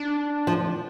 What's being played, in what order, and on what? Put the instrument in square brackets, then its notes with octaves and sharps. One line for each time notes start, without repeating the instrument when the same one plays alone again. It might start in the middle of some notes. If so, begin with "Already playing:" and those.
Already playing: [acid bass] D4
[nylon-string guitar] F3